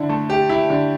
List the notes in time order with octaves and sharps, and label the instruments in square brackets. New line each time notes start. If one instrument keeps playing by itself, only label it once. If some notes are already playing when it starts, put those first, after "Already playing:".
Already playing: [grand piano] D3 E4
A3
G4
E4
D3